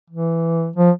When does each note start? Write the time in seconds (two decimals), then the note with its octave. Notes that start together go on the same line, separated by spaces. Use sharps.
0.10 E3
0.76 F3